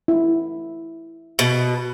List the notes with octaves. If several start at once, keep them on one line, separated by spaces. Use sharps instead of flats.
E4
B2